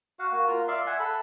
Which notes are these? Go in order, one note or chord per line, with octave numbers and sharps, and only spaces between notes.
F#4 F5 F#5
A#3 F#4
F4 A#4
D5 E5 F5 C6
E5 F#5 G#5
A4 B5